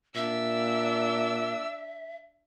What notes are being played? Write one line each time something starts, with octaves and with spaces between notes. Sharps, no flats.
A#2 D4 E5 E6